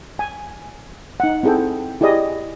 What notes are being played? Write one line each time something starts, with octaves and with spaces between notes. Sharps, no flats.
G#5
D#4 F#5
C4 E4 G#4 A4 G5
E4 G4 G#4 D5 D#5